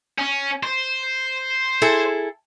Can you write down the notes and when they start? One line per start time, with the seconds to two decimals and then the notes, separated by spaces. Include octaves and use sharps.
0.18 C#4
0.63 C5
1.82 E4 G#4 A4